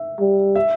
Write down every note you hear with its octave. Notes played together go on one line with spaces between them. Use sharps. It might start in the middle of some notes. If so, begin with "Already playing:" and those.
Already playing: E5
G3
E5